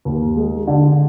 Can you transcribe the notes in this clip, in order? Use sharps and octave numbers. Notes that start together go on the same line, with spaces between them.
D#2
G#3
D3